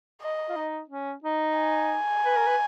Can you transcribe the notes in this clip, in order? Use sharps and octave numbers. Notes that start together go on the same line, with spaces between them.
D#5
F4
D#4
C#4
D#4
G#5
B4
A#4
B4